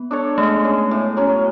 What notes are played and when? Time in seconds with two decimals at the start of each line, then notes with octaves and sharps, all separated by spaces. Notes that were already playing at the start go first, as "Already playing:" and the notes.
Already playing: B3 B4
0.11 D4 A4 C#5
0.38 G#3 A3
0.64 C#4 G#4
0.91 A2
1.17 F#3 C#4